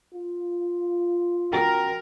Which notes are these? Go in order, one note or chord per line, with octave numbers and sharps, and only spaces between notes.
F4
C#4 F#4 A#4 G5